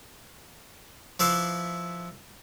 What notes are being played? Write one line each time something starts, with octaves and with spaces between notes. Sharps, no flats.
F3 E4 B4 E5 C6 D6